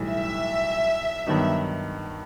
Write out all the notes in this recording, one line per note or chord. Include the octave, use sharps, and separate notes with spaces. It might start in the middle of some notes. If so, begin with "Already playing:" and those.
Already playing: B1 A2 E3 G3
E5
G2 D#3 F#3 B3 D#4